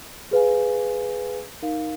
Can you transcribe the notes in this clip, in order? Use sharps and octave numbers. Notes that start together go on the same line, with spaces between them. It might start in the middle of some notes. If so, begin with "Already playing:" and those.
G#4 B4 F5 G#5
D#4 A#4 F5